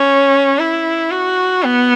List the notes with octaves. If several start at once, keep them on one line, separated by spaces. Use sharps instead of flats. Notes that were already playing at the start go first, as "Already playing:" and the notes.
Already playing: C#4
E4
F#4
B3